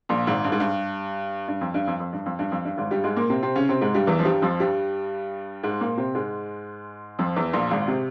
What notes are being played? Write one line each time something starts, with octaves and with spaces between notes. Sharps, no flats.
A#1 A#2
G#1 G#2
G2
G#2
G2
G2
F2
G2
F2
F2
G2
F2
G2
F2
G2
G#1 G#2
G2 G3
G#2 G#3
A#2 A#3
C3 C4
C3 C4
C#3 C#4
C3 C4
G#2 G#3
G2 G3
E2 E3
F3
G2 G3
F2 F3
G2 G3
G#2 G#3
A#2 A#3
C3 C4
G#2 G#3
F2 F3
E2 E3
A#1 A#2
G#1 G#2
C3